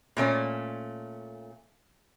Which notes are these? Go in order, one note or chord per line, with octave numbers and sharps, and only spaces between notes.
A#2 A3 C#4